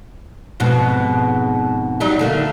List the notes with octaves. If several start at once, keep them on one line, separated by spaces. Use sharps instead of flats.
F2 G#2 B2
F#3 G3 D#4
D3 A3 A#3